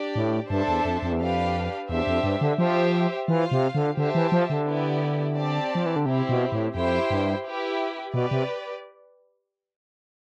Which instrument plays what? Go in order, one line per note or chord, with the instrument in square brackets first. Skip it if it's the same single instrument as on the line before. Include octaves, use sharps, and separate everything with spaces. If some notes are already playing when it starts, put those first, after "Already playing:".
Already playing: [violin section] D4 G4 D5
[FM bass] A2
[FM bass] G2 [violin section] D4 A4 C5 E5 A5
[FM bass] E2
F2
F2
E2
[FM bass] F2 [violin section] D4 G4 B4 F5
[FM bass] E2 [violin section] D4 G4 C5 E5
[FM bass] F2
G2
D3
[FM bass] F3 [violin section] G4 C5 E5
[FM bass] E3 [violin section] F4 C5 F5
[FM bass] C3
D3
[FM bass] D3 [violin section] G4 C5 E5 A5
[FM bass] E3
F3
D3
[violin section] B3 E4 G4 D5
C4 G4 D5 A5
[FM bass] F3
E3
D3
[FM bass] C3 [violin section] C4 E4 G4
[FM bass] B2
A2
[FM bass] F2 [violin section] E4 G4 C5 G5
[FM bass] G2
[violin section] E4 G4 B4
[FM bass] B2 [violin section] G4 B4 D5
[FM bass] C3